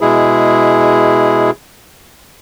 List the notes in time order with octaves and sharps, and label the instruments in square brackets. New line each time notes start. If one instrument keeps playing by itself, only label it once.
[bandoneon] B2 G#3 E4 G#4